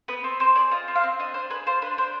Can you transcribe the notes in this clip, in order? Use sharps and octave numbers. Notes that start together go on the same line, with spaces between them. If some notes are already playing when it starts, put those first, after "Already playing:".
B3 B4
C4
C4 C5
G#4 D5
F4 D#5
C4
F5
C4
D4 D#5
D4 C5
G#4 B4
F4 C5
D4 B4
D4 C5